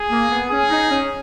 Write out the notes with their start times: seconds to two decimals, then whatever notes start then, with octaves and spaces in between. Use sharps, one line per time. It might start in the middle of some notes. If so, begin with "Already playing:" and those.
Already playing: G#4
0.11 A#3
0.30 B3
0.50 C#4 G#4
0.70 D#4
0.90 C#4